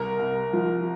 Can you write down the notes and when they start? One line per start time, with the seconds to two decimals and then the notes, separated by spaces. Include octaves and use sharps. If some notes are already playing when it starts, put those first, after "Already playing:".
Already playing: C2 A#4
0.19 C2
0.53 F3